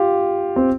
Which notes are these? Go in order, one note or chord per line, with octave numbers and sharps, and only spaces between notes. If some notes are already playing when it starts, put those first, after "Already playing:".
Already playing: F4 G4
C4